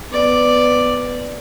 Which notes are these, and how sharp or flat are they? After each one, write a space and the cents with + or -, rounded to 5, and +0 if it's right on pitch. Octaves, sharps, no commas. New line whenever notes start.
B3 +10 D5 +0